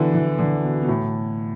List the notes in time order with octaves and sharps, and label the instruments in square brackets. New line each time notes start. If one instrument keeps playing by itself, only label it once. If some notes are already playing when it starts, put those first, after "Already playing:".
Already playing: [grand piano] B2 D3 E3
E3
D3
B2
B2
A2